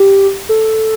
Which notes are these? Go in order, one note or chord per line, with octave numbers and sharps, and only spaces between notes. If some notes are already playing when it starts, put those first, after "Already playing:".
Already playing: G4
A4